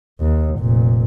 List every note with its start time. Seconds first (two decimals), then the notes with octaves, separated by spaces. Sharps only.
0.21 D#2
0.59 F1 A#2